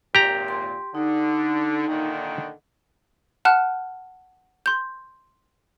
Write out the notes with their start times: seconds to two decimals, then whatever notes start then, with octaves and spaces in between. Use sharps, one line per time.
0.15 G#1 A#2 G4 A#5
0.48 C6
0.95 D3 D#4
1.88 A#2 D3 D#3
3.45 F#5 A5 F6 F#6
4.66 C6 G6